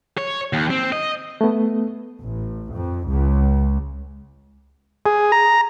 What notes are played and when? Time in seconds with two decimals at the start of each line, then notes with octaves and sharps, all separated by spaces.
0.17 C#5
0.53 D#2
0.70 C4
0.92 D#5
1.41 A3 B3
2.21 A1
2.73 F2
3.09 C#2
5.06 G#4
5.32 A#5